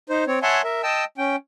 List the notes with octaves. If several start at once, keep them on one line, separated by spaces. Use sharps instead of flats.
D#4 C5
C4 C#5
C#5 E5 F#5 G#5 A5 C6
A#4 E5
D#5 G5 A5 E6
C#4 G5